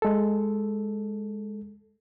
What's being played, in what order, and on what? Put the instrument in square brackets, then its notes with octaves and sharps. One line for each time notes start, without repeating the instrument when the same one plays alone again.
[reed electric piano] G#3 A4